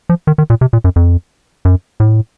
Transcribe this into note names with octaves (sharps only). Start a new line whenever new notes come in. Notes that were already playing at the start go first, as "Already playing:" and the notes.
F3
D#3
D#3
A#2
C3
A#2
F#2
F2
F#2
A2